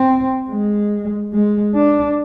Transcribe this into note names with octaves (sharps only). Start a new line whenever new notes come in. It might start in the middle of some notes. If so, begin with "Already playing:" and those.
Already playing: C4
G#3
G#3
D4